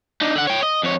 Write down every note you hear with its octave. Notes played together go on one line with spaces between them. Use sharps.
D4 D#4
D3 F#5
C#5 G5
D#5
F2 C#5